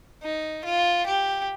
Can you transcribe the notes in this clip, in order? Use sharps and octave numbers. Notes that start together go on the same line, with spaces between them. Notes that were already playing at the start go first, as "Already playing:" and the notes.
D#4
F4
G4